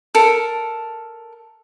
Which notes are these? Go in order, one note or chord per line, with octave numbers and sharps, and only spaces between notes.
A4 A#4